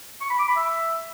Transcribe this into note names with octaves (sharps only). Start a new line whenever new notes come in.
C#6
B5
D6
B5
E5